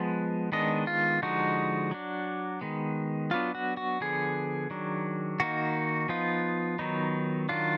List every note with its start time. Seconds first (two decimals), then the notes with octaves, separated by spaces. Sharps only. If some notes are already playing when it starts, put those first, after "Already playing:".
Already playing: F3 G#3 B3
0.52 D#3 G#3 B3 D4 D#5
0.87 F4
1.22 D3 F3 G#3 D#4 F#4
1.91 F#3 D4
2.61 D#3 G#3 B3
3.31 F#3 B3 D4 F4
3.55 F#4
3.77 F#4
4.00 D3 F3 B3 G#4
4.70 D#3 F#3 D4
5.40 D#3 A#3 D#4 F#4
6.09 F3 B3 D#4 F4
6.79 D#3 F#3 B3 D#4
7.49 D#3 F#3 D4 F4